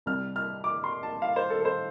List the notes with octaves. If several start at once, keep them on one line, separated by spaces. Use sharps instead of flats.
C2 C3 G3 F6
F6
D6
C6
A5
F5
C5
A4
A4
C5